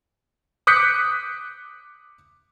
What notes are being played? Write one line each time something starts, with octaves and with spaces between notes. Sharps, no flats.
D6 D#6 F#6 G6 B6 C#7